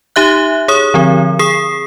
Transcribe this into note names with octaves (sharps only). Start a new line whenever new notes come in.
D#4 G4 E5 F#6
G#4 C#5 D#6
D3 F3 C4
G#4 D#6 C7